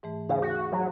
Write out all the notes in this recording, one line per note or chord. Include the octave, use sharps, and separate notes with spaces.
G#2 E3 A3
D#2 C#3 G#4 F5
F#4
F#3